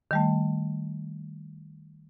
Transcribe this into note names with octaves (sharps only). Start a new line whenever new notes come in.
D#3 G3 A3